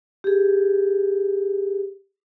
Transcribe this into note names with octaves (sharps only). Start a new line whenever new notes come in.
G4 G#4